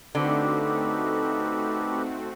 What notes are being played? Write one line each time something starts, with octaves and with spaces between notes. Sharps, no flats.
D3 A3 C4 D#4 F#4 G4 A4 B4